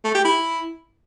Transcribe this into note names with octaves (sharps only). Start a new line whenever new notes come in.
A3
G4
E4